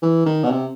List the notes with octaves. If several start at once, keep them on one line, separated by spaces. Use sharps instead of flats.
E3
D#3
B2
C3